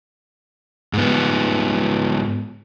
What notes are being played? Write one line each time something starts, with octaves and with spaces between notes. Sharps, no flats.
G#2 B3